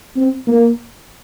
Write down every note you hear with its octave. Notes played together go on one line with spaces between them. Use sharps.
C4
A#3